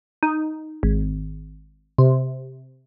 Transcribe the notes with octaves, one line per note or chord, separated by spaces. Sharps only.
D#4
G#1
C3